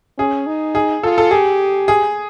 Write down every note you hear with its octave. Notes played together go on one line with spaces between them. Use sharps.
C#4 G#4
D#4
G#4
F4 A4
A4
G4 G#4
G#4